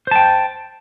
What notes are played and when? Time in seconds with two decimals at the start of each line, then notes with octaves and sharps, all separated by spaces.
0.07 C5
0.11 A5
0.16 G5